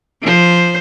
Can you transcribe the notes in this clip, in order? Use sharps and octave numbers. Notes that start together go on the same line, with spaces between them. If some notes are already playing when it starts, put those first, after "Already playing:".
F3 C5